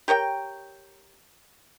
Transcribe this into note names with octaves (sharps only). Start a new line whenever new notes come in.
G4 A#4 C#5 G5